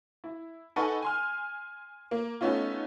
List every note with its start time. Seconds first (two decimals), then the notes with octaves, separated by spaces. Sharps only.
0.24 E4
0.76 D#4 A4 B4 F#5 G#5 C#6
1.02 G#5 C6 F6
2.11 A#3
2.41 A3 B3 C#4 D#4 F4